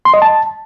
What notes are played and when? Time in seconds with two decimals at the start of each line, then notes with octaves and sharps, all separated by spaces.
0.05 C6
0.14 D#5
0.22 A5